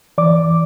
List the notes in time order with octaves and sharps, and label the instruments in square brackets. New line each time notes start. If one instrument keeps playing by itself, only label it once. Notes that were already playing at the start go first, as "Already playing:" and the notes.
[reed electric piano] E3 D5 D6